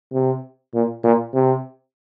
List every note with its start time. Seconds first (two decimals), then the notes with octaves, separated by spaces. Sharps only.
0.13 C3
0.74 A#2
1.04 A#2
1.34 C3